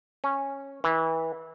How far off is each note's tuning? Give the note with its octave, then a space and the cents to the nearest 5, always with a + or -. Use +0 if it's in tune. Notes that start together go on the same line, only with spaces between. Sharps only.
C#4 -10
E3 -25